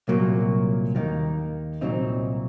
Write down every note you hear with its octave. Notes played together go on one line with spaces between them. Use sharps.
C2 A#2 F#3 A#3
D#2 D#3 A#3 D#4
C2 A#2 F#3 C4 D#4